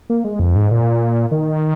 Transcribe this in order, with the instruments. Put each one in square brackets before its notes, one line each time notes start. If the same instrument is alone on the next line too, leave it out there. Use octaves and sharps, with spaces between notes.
[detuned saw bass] A#3
G#3
F2
G#2
A#2
D#3